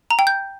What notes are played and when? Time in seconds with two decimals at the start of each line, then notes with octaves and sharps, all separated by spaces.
0.11 A#5
0.19 G5
0.27 G6